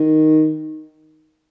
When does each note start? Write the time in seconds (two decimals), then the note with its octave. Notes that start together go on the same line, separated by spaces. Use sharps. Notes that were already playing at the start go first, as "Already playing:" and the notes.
Already playing: D#3